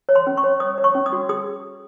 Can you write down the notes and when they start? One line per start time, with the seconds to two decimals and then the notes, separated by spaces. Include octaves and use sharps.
0.09 C#5
0.15 C6
0.27 C#4
0.37 C#6
0.44 C#5
0.60 C#5 D#6
0.78 C#5
0.84 C#6
0.95 C#4
1.06 D#6
1.12 F#4
1.29 G#4 D#6